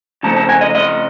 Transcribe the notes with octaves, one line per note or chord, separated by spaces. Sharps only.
C#3 F3 A3 A5
A5
G#5
D#5
D#5